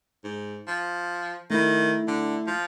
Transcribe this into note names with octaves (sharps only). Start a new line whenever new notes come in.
G#2
F3
D#3 A3 E4
D3
F3